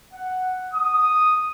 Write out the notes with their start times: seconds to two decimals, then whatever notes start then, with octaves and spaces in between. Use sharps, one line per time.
0.14 F#5
0.74 D#6